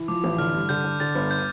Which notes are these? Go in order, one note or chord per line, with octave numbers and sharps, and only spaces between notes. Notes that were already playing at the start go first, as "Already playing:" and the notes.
Already playing: E3
F3 D6
A1
D3 F6
G2
D3 G6
D3
D3 A6
G1
G6